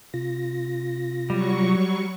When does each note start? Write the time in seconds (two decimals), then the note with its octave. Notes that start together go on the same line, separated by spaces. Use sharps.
0.14 C3 F4 A#6
1.30 F#3 G3 C#6